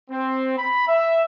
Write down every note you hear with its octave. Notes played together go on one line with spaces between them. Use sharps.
C4
B5
E5